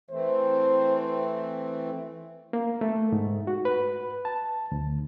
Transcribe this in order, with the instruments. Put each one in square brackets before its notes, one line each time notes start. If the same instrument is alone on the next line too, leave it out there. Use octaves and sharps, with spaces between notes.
[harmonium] E3 A3 C4 [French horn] C5
[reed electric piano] A#3
A3
G#2
F#4
B4
A5
D2